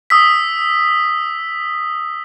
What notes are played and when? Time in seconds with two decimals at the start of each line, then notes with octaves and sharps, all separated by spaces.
0.10 D#6 E6 B6